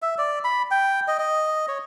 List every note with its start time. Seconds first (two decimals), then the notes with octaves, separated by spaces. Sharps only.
0.02 E5
0.18 D5
0.44 B5
0.71 G5
1.08 D#5
1.19 D#5
1.68 C#5